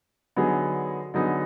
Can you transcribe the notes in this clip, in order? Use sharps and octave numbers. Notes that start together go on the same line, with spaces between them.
D3 F#3 B3 D#4 G#4
D3 F#3 B3 D#4 G#4